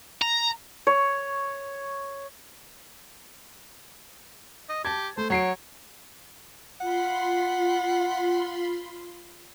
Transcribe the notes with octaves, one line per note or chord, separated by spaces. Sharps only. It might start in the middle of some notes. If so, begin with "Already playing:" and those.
A#5
C#5
D#5
G4 A5 G#6
A3 C5
F#3 C#5 C7 D7
F4 F#5 B5 C6